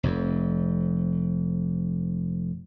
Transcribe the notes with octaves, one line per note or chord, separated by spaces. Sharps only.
F1 F2